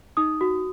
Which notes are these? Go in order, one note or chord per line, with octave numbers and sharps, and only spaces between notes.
D#4 D#6
F#4